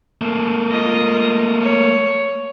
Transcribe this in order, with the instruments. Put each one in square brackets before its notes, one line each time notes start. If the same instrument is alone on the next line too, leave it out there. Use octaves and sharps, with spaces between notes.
[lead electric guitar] A3 A#3
[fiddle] F4 D#5
C#5